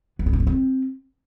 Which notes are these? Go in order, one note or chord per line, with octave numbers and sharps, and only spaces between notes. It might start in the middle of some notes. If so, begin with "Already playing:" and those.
B3
E4
D4
C#4
C4